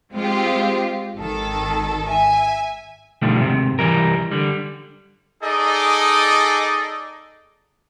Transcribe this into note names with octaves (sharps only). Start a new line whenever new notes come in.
G#3 C4 F4 G4
G#1 D#3 A4
E5 G#5
B2 D3 D#3 F3 G3 A3
D#2 G#2 C3
C2 E3 G3 A#4
D3 G3
D#4 G#4 A4 D5 D#5